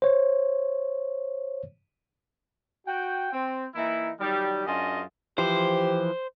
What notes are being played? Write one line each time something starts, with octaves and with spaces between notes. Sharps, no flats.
C5 C#5
F#4 G5
C4
E3 A#3 D#4 E4
D#3 F#3 G3
F#2 D4 F4 G#4 D#5
E3 F3 G4 C5